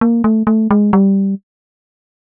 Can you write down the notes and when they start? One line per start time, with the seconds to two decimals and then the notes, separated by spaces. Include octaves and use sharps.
0.01 A#3
0.24 A3
0.47 A3
0.71 G#3
0.93 G3